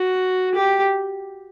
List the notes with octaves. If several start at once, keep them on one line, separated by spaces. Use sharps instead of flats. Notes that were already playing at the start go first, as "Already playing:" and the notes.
Already playing: F#4
G4